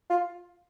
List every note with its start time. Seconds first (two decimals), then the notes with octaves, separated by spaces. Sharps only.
0.10 F4